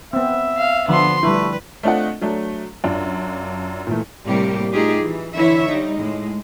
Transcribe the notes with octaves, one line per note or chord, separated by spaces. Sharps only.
B3 C4 E5
F5
D3 F3 B3 D4 C6
G3 A3 E4 B4
A3 C4 D4 F4 D#5 F#5
F#3 A3 D4
F#2 D4 F4
A#2 E3 A3
A2 C3 G3 A#3 G4
A3 D#4 F4 G4 G#4
E3
D3 E3 E4 C#5 E5
G3 D#4
A2 G#3